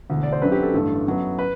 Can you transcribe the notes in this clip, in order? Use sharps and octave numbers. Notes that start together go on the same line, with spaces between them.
E1 D2 D3
D5
C5
F#2 D3 F#3 C4 B4
G4
A4
A1 G2 D3 A3
F#2 F#3 B3
B4